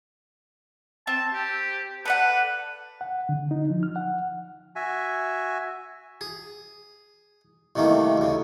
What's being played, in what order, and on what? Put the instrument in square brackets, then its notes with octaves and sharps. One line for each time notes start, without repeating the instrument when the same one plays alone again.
[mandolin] C4 [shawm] A5
[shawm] G4
[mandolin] A4 D5 F#5 [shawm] B4
[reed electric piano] F#5
D3
D#4
F3
F6
F#5
[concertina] F#4 E5 G#5
[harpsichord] G#4
C2 C3 D#3 A3 A#3
D2 C#3